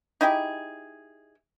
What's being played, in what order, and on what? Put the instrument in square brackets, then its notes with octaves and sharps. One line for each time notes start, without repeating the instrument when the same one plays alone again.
[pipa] D#4 E4 G4 G#4